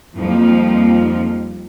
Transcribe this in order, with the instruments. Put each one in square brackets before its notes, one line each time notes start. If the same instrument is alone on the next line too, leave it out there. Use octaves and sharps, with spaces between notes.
[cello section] F2 F3 G3 A#3 D#4 F5